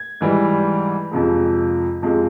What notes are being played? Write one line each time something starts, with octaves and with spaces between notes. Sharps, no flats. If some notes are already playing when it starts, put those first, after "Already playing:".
Already playing: G#6
G#2 E3 G3
F2 C3 F3 G#3
F2 C3 F3 G#3